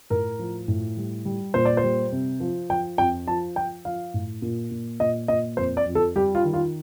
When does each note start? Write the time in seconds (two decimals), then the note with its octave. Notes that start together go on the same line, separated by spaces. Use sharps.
0.10 A2 A#4
0.39 F3
0.68 A2
0.97 G3
1.25 G3
1.54 A#2 C5
1.65 D5
1.77 C5
1.83 G3
2.12 C3
2.40 F3
2.70 F3 G5
2.98 F2 G5
3.27 F3 A5
3.56 F3 G5
3.85 F3 F5
4.14 A2
4.42 A#2
4.71 A#2
5.00 A#2 D#5
5.28 A#2 D#5
5.57 F2 C5
5.77 D5
5.86 F2
5.95 A4
6.16 G3 G4
6.35 F4
6.44 D#3
6.54 F4